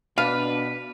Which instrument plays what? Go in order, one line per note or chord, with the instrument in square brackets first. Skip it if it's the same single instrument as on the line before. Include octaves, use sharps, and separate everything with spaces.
[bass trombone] B2 [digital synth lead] D4 [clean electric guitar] B4 [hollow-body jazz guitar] F5